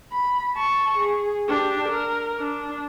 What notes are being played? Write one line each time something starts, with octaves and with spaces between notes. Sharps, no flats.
B5
A5 C#6
G#4
D4 G4
A#4
D4